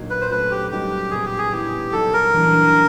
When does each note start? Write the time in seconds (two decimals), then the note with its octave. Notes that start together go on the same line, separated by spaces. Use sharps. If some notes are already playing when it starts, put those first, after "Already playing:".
Already playing: A#2 F#3 A#3 D#4 F#4
0.10 B4
0.21 C5
0.30 A3 C#4 F#4 B4
0.51 G4
0.71 G3 A#3 D#4 F#4 G4
1.11 A#2 G3 B3 G#4
1.26 G4
1.38 G#4
1.52 F#3 B3 E4 G4
1.91 A#2 F#3 B3 D#4 A4
2.13 A#4
2.33 E3 G3 A#3 D4